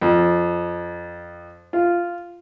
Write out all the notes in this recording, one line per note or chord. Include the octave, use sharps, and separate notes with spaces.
F2
F4